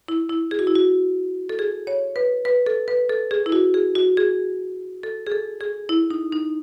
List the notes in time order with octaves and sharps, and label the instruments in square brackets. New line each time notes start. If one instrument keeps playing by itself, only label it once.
[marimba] E4
E4
G#4
F#4
E4
F#4
A4
G#4
C#5
B4
B4
A4
B4
A4
G#4
E4
F#4
G#4
F#4
G#4
A4
G#4
A4
G#4
E4
D#4
D#4